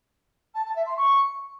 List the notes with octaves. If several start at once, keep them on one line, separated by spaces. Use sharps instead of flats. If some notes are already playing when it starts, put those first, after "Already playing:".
A5
A5
E5
C6
C#6